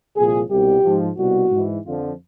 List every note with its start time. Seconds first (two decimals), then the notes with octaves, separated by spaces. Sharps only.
0.16 C2 A#2 F3 G#4
0.50 C2 B2 G4
0.83 G#2 F3
1.17 C2 B2 F#4
1.50 G#2 E3
1.84 F2 D3 F3 F4